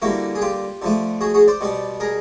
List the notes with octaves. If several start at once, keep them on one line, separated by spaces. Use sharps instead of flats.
D3 G3 A#3 E4 F#4
G#4
F4 G4
D3 F3 A3
F#4 G#4
F#4 G#4
C5 D5
B2 G3 B3
G#4 A#4